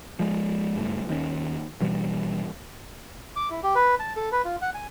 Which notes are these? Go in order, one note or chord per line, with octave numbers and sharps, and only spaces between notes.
F3 G#3
F#1 G2 A3
D#2 D#3 E3 C#4
G2 B2 E3 G3
D6
E4
G4
B4
A5
A4
B4
F4
F#5
G#5